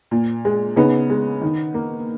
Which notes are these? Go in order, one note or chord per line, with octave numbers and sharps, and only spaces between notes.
A#2
G#3
C#3 B3 D#4
G#3
D#3
A#3